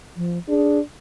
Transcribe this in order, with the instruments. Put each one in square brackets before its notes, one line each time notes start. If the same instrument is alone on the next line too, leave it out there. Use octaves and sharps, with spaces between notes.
[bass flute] F3
[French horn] D4 [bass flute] G#4